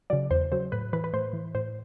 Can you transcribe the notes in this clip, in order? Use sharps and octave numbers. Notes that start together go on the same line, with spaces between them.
C#3 F#3 D5
E2 C5
C#3 F#3 C5
A2 B4
E3 B4
B4
A2 C5
E3
A2 C5